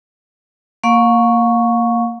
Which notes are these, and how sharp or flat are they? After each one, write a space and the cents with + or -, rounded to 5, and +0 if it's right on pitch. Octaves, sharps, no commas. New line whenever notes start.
A#3 -10 F5 +35 C#6 +0